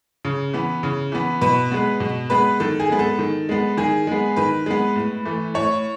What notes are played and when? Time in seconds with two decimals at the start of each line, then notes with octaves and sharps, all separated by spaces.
0.25 C#3
0.53 E3 B3
0.83 C#3
1.12 E3 B3
1.41 B2 B4
1.72 G#3 B3
2.00 B2
2.30 G#3 B3 B4
2.60 D#3 A4
2.80 G#4
2.90 G#3 B3
2.99 A4
3.19 D#3
3.49 G#3 B3
3.77 D#3 G#4
4.07 G#3 B3
4.36 D#3 B4
4.66 G#3 B3
4.95 A2
5.25 E3 A3
5.54 A2 C#5